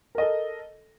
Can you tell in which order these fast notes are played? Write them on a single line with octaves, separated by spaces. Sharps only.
A#4 D#5 A4